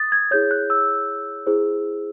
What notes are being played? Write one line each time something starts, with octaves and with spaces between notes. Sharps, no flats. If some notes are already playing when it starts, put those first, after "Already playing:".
Already playing: D#6 A6
G#6
E4 G#4 C#5 G6
F#6
E6
E4 G#4 C5